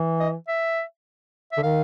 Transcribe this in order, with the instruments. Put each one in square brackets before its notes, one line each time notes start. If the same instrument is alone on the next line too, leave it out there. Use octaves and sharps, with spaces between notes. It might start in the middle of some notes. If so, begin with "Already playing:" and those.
Already playing: [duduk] E3
[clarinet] D#5
E5
E5
[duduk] D3
[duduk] D#3 [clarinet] F5